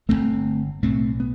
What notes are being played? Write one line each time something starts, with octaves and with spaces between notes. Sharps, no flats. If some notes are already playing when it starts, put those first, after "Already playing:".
G1 G2 D3 A3 C4
B1 A2 A3 C4
B3